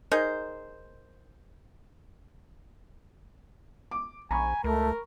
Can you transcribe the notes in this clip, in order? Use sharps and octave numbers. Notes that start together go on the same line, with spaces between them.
D#4 G#4 A#4 C5
D6
A#1 G#5 A#5 B5 C#6
C#2 A3 A#4